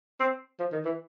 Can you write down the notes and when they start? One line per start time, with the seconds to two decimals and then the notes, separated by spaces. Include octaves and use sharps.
0.20 C4
0.59 F3
0.72 D#3
0.85 E3